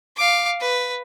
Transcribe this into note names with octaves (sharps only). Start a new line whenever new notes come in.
F5 D6
B4